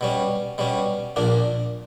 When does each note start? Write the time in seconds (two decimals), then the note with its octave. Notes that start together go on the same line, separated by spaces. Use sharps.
0.01 B2 G3 C#4
0.58 B2 G3 C#4
1.16 A#1 A#2 A#3 D4